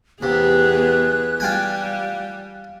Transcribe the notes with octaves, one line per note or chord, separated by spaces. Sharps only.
E2 C3 B3 G#4 F#6
G3 F4 G5 G#5